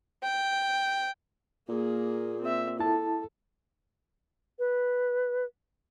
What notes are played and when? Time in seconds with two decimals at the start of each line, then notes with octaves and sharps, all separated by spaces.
0.23 G5
1.69 A#2 A#3 G#4
2.41 C4 E5
2.79 E4 A4 A5
4.59 B4